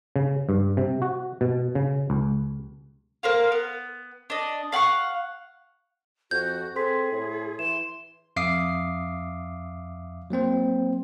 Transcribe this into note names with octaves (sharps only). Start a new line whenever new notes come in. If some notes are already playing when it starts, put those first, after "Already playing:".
C#3
G2
C3
F#4
B2
C#3
C#2
A#4 C5 F5
B3
D4 D#5
F5 F#5 C6 C#6
F2 F#4 G6
C4 G#4 A4 C6 B6
A2
E3 C6 E7
F2 E5 F5 D6 D#6 C7
F#3 A#3 C4 C5